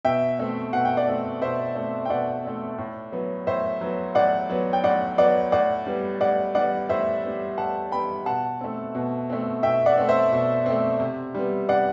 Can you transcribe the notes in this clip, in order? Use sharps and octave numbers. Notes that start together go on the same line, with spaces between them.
B2 E5 G5
A3 C4
B2 F#5
G5
D5 F#5
A3 C4
B2 C5 E5
A3 C4
G5
B2 D5 F#5
A3 C4
A2
F#3 B3
A2 C5 E5
F#3 B3
A2 D5 F#5
F#3 B3
G5
A2 D5 F#5
F#3 B3 D5 F#5
A2 D5 F#5
G3 B3
A2 D5 F#5
G3 B3 D5 F#5
A2 C5 E5
G3 B3
A2 F#5 A5
G3 B3 G5 B5
B2 F#5 A5
A3 C4
B2
A3 C4
B2 E5 G5
D5 F#5
A3 C4
C5 E5
B2
A3 C4
C3
G3 B3
C3 D5 F#5